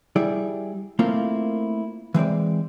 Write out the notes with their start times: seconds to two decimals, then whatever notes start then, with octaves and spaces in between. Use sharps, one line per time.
0.16 G3 E4 G#4 D5
0.99 A3 A#3 C4 E4 F4
2.14 E3 G#3 C4 D5